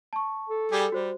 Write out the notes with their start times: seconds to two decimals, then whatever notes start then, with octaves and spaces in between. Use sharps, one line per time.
0.13 A5 C#6
0.49 A4
0.72 G3 G4 G#4
0.92 G3 F#4 C5